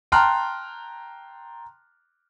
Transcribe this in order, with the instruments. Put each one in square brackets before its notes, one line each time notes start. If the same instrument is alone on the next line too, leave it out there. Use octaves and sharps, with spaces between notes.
[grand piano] G5 A5 A#5 C6 F6 F#6